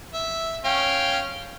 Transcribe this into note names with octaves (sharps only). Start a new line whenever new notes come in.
E5
C#4 F5 G5